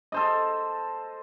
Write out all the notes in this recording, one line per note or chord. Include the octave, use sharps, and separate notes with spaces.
A4 C5 D#5